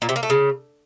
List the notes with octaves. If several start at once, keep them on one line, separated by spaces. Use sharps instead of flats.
A#2
C3
A#3
A3
C#3